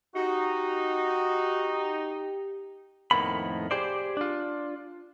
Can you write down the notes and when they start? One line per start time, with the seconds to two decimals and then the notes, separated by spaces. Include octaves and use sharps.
0.16 D#4 F#4 G4
3.11 F2 A2 D#3 A#3 B3 B5
3.71 G4 G#4 C5 D5
4.17 D4 F4